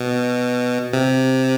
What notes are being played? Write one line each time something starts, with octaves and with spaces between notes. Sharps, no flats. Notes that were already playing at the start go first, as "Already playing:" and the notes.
Already playing: B2
C3